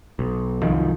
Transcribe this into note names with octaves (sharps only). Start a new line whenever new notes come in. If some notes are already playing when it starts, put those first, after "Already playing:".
B1
C2 F#2 D#3 F3